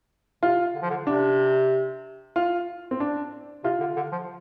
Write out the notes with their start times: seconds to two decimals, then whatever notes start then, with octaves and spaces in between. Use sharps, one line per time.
0.43 C3 F4
0.75 D3
0.82 F3
0.90 D3
1.07 C3 D4
2.36 F4
2.91 C4
3.00 D4
3.64 C3 F4
3.80 D3
3.96 D3
4.12 F3